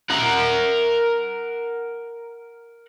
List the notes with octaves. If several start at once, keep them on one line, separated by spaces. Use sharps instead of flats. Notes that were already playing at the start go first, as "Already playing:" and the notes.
A#4 F#5